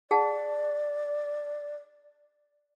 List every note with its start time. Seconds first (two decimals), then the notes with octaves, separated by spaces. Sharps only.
0.11 G#4 D5 F#5 A5